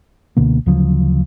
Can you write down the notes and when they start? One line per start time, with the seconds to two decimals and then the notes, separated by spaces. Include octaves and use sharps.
0.37 C#2 B2 D3 A#3
0.66 D2 C#3 F3 F#3